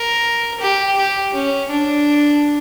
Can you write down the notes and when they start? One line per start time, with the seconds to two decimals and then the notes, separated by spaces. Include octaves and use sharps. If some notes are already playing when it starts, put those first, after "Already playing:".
Already playing: A#4
0.60 G4
0.97 G4
1.34 C#4
1.70 D4